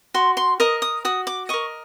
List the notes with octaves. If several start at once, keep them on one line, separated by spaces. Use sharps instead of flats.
F#4 C6
C6
A#4 D#5 D#6
D#6
F#4 D#6
D6
A#4 D#5 C#6